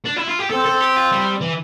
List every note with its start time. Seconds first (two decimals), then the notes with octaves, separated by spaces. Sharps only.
0.05 D4
0.16 E4
0.27 F4
0.39 G4
0.50 C4 A4
0.65 A4
0.80 G4
0.96 F4
1.12 G3
1.42 E3